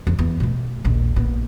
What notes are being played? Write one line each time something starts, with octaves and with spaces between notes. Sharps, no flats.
F2
E2
B2 A3
A#1 D#2
A#1 B3